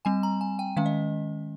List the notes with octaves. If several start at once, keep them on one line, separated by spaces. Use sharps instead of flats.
G3 C4 G#5
A#5
G#5
G5
D#3 G#3 C#4 F5
D#5